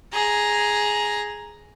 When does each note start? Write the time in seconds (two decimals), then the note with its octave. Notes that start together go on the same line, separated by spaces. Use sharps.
0.13 G#4 A#5